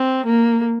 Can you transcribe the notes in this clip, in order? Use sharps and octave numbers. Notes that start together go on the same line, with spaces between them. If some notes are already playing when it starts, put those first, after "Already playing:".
Already playing: C4
A#3